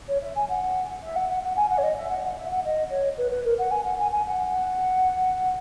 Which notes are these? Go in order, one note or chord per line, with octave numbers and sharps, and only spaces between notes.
C#5
E5
G#5
F#5
E5
F#5
F#5
F#5
G#5
F#5
C#5
D#5
E5
F#5
F#5
E5
F#5
D#5
C#5
B4
B4
A#4
F#5
G#5
F#5
G#5
G#5
F#5